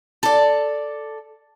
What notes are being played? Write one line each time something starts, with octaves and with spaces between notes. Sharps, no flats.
A4 D5